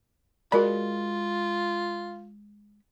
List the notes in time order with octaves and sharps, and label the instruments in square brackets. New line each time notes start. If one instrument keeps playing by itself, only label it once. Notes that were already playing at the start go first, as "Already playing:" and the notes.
[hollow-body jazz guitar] G#3 B5 [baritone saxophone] F4 [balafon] F#4 A#4 D5